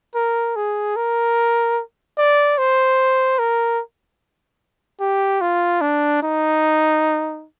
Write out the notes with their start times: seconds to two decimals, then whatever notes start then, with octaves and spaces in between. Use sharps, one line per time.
0.15 A#4
0.56 G#4
0.96 A#4
2.18 D5
2.58 C5
3.39 A#4
5.00 G4
5.41 F4
5.81 D4
6.23 D#4